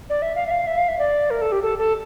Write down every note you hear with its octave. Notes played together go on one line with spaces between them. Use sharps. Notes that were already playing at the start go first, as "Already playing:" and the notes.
D5
E5
F5
E5
F5
E5
F5
E5
D5
A#4
A4
G4
A4
A4